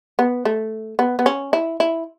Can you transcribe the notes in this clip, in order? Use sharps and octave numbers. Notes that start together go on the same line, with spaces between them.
B3
A3
B3
B3
C#4
E4
E4